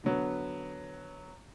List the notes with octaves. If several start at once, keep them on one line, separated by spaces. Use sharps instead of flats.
D3 F#3 B3